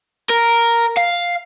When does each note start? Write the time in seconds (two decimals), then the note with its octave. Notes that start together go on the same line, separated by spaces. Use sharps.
0.29 A#4
0.97 F5